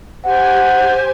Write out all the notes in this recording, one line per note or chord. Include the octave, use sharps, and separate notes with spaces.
G4 C5 F#5 G#5